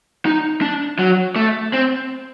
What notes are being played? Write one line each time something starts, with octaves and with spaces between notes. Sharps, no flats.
D#4
D4
F#3
A3
C4